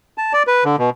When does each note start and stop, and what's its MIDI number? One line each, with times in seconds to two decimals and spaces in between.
0.18 0.33 81
0.33 0.43 74
0.47 0.64 71
0.65 0.76 50
0.79 0.90 47